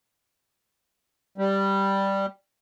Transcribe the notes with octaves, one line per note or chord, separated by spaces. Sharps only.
G3